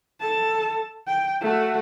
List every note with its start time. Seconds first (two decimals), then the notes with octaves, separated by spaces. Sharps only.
0.20 A4 A5
1.08 G5
1.41 A3 F#4